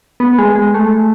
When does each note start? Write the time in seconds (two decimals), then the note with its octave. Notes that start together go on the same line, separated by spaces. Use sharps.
0.20 B3
0.38 G#3
0.55 G#3
0.74 A3